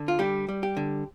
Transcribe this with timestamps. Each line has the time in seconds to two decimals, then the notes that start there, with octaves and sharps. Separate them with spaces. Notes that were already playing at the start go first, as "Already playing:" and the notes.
Already playing: D3
0.08 F4
0.19 G3 G4
0.49 G3
0.63 G4
0.77 D3